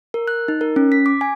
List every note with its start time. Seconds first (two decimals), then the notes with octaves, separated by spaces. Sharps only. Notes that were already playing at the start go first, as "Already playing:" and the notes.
0.14 A#4
0.28 F#6
0.48 D#4
0.61 A#4
0.76 C#4
0.92 B6
1.06 D6
1.21 G#5